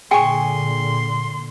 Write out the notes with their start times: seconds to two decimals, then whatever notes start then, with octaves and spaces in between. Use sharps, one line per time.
0.11 A#2 D3 G#4 G5 G#5 C6 C#6